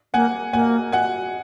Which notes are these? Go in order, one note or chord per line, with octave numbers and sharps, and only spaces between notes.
A#3 F#5 G#5
A#3 F#5 G#5
F#5 G#5